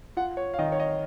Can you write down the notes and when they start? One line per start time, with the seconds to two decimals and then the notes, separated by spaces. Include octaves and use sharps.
0.17 F4 F#5
0.37 C#5
0.54 F5
0.58 D#3 D#5
0.72 C#5
0.80 D#5